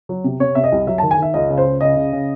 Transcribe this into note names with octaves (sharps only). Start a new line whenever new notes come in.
F#3
C3
C3 C#5
C3 E5
D#5
C2
F#3 E5
A5
D#3
G#5
D#3 E5
C#2 D#5
C#3
C5
C#2
C#3 D#5
C#3
C#3